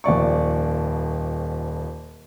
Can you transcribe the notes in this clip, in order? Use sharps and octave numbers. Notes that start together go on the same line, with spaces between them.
D#1 F2 D5 C#6